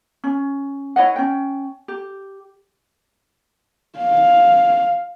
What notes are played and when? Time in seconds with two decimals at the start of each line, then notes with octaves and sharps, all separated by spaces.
0.24 C#4
0.96 E4 C#5 D#5 F#5
1.16 C#4 G5
1.88 G4
3.98 F5